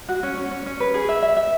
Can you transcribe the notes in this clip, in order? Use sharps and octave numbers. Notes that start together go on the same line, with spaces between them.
F#4
C#4
C#4
C#4
C#4
B4
G#4
E5
E5
E5